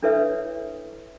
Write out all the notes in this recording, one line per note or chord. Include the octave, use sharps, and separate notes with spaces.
D4 E4 A4 B4 C#5 E5